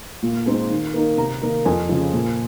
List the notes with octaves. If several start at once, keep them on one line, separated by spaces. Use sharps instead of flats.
A#2
G#3 C4 D#4
D#3
A#3 D#4
C3 A#5
D#3 A#3 D#4
F2 G#5
C#3 F3
A#2